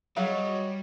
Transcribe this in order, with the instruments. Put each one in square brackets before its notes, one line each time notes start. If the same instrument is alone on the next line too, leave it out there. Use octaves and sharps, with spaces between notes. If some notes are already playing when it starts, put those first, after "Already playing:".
[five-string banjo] F#3 G#4 F5 [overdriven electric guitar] G3 [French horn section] F#4 D#5 [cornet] C#5